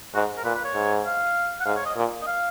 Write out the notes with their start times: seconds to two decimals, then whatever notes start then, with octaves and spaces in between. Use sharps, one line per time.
0.14 G#2 F#4
0.37 A#4
0.44 A#2 B4
0.55 B4
0.64 C#5
0.74 G#2
1.05 F5
1.60 F#5
1.65 G#2 F5
1.76 C#5
1.86 D#5
1.96 A#2
2.22 D#5
2.27 F5